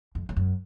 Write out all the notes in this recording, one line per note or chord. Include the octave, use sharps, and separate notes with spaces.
F2
F2
F#2